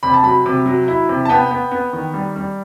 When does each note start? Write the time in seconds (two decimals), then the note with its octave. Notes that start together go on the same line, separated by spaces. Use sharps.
0.03 C3 B5
0.14 A5
0.24 F#3 B5
0.46 C3
0.66 F#3
0.88 E4
1.09 C3
1.25 A5
1.29 B3 G5
1.51 B3
1.71 B3
1.93 D#3
2.14 G3
2.36 G3